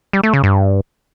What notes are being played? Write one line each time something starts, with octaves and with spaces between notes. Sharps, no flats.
G3
A3
C#3
G2